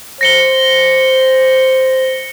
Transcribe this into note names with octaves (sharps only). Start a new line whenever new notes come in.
C5 A#6 C#7 G7